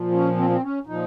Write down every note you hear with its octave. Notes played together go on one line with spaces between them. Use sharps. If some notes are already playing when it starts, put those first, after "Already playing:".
Already playing: A#2 F3
C#4
C4
C4
C#4
A#2 F3 D#4